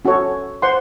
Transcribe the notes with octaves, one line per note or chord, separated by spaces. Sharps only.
C#4 F#4 A4 C#5
C5 F#5 C6